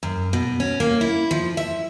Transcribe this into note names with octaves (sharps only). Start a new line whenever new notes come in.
F#2
B2
C#4
A#3
E4
F3
E5